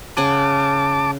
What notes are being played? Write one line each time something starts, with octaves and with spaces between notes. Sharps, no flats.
C#3 F#5 G#5 A5 D6